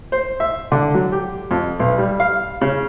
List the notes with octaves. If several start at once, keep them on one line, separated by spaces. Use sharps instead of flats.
C5
E5
D3
F#3
G4
F2
B1
G3
F5
C#3